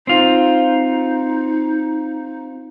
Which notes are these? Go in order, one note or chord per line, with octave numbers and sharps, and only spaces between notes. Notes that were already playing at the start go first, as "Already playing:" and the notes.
C4 D#4 F4